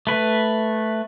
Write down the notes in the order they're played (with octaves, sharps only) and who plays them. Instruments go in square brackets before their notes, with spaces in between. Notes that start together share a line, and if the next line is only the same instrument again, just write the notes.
[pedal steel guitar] A3 B4